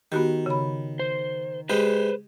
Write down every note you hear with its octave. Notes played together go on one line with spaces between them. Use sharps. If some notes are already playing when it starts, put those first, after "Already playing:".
D#3 B3 F#4 G4
C#3 B5
C5
G#3 G4 B4 C5